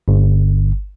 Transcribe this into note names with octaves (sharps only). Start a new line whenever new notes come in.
G1